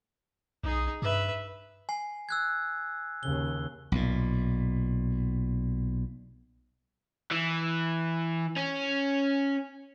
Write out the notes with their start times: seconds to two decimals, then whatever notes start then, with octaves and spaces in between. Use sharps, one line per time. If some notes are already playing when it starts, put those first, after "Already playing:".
0.64 B1 D#4 G#4
1.02 G2 B4 E5
1.89 G#5 C7
2.29 E6 F#6 G#6
3.23 D#2 C#3 G7
3.92 B1 A#2
7.31 E3
8.56 C#4